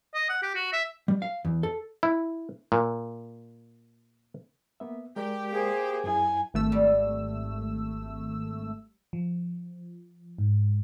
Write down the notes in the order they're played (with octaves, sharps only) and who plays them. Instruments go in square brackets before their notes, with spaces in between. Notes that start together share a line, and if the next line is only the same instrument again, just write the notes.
[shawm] D#5
F#5
G4
F#4
E5
[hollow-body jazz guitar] G3
F5
E2
A4
[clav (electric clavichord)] E4
A#2
[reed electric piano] A#3 B3 E5
[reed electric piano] G#3 A#4 D5 [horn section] G4
[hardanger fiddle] A#3 C5 [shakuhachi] G#4
[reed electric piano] F#2 E4 [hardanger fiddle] G#5
[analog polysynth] G#1 A3 E6
[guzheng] G3
[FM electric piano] F3
G#2